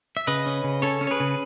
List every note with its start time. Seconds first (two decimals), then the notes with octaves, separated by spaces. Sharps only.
0.17 E5
0.27 C#3 B4 D#5
0.46 C#4
0.64 C#3
0.82 C#4 A4 C#5
1.01 C#4
1.07 C#5
1.11 G#4 B4
1.20 C#3